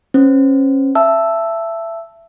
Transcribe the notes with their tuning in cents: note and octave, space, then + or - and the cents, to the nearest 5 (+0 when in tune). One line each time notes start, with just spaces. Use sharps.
C#4 -30 C5 -35
E5 +20 A5 +0 E6 +0